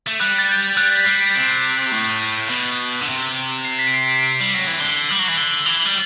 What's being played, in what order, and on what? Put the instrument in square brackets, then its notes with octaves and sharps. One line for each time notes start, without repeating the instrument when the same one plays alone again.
[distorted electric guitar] A3
[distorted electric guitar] G3 [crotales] F#6
[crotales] A6
G6
[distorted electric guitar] G3 [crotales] F#6
[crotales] B6
[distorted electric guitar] G3 [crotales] C7
[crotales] D7
[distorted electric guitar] C3 [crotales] D7
[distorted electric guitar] A2
B2
D3
C3
[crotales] C7
B6
D7
C7
D7
C7
D7
[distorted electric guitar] G3
[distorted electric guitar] F#3 [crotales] C7
[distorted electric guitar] E3
[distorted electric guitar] D3 [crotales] G7
[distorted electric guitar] G3 [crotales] F#7
[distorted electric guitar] F#3
[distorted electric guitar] E3 [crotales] F#7
[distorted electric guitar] D3 [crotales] G7
[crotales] F#7
[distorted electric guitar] E3 [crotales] G7
[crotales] F#7
[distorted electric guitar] G3